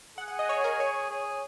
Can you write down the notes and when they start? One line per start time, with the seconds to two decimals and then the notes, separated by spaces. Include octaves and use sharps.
0.18 G#4 F#5
0.28 F#5
0.39 D#5
0.49 C#5
0.64 A#4
0.80 C#5
1.10 G#4